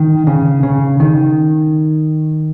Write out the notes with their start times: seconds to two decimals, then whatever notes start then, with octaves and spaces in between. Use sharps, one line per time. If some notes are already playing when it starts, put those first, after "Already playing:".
Already playing: D#3
0.27 C#3
0.63 C#3
1.00 D#3